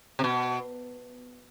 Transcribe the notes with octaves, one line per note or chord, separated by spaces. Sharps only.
C3
B2